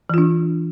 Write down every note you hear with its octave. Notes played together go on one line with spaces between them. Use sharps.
E3 D4 F4